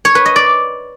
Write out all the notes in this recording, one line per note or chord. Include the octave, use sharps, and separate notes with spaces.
C#5
B4
D#5
D5